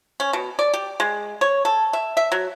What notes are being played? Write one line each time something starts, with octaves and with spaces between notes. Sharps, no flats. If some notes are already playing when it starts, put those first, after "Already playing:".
C#4
B2
D5
G4
G#3
C#5
A4
E5
E5
F#3